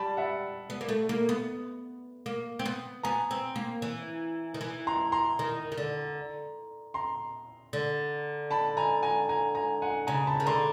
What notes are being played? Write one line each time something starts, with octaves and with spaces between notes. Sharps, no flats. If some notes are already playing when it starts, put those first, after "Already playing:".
Already playing: G3 A5 B5
E5 F#5
B3
A#3
A3
A#3
B3
A#3
C4
B3
B3 G#5 A#5
C4
A#3
E3
D#3
E3
A#5 C6
A#5 C6
D#3
D#3
D3
A#5 C6
D3
A5 B5
G#5 A#5
G#5 A#5
G#5 A#5
G#5 A#5
F#5 G#5
C#3 G#5 A#5
A5 B5
D#3
D3 A#5 C6